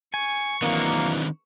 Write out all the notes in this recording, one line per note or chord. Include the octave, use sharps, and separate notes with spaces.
G#5 C#6
D#3 E3 F#3 A#3 C4 D4 D#5